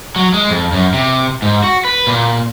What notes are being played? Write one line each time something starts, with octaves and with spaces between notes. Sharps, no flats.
F#3
G#3
F2
F#2
C3
G#2
F#4
B4
A#2